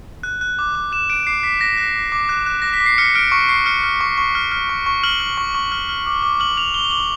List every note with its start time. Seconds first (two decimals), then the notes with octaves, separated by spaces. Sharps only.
0.23 F#6
0.41 F#6
0.59 D6
0.75 D6
0.92 F#6 E7
1.10 F#6 D7
1.27 D6 C7
1.43 D6 B6
1.60 F#6 A#6
1.77 F#6
1.96 D6
2.12 D6
2.29 F#6
2.46 F#6
2.62 D6 A#6
2.73 B6
2.80 D6
2.86 C7
2.98 F6 C#7
3.15 F6 D7
3.32 C#6 C#7
3.49 C#6 C7
3.66 F6 C#7
3.84 F6
4.01 C#6
4.18 C#6
4.35 F6
4.52 F6
4.69 C#6
4.86 C#6
5.03 F6 F#7
5.20 F6
5.38 C#6
5.55 C#6
5.72 F6
5.89 F6
6.06 D6
6.23 D6
6.40 F6 F#7
6.57 F6 F7
6.74 D6 G7
6.85 F7
6.91 D6 F#7